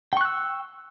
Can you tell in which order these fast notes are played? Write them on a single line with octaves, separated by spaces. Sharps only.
G5 C#6 F#6 E6